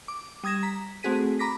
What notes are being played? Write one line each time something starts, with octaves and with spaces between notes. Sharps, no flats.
D6
G3 D#6 G#6 A#6 E7
A#5 B6
A3 C4 F#4 G#4 B6 D#7
A#5 B5 D6 A#6 B6